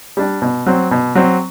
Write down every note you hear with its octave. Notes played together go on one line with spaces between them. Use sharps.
G3 D4
B2
F#3 C4
B2
F#3 C4